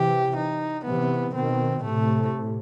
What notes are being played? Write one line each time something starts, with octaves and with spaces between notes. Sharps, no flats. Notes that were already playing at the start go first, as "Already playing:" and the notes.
Already playing: C3 E3 G4
D#4
C3 E3 B3
B2 D#3 C4
A2 C3 A3